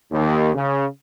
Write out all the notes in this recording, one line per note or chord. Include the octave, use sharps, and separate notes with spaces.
D#2
C#3